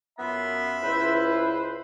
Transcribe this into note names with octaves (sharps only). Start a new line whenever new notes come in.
F#2 B3 F4 E5 B5
C#2 E4 B4 C5